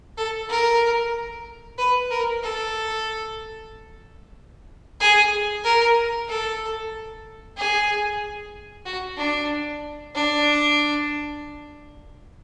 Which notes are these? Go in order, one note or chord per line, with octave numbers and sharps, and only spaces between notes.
A4
A#4
B4
A#4
A4
G#4
A#4
A4
G#4
F#4
D4
D4